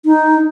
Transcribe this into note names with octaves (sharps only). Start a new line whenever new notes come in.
D#4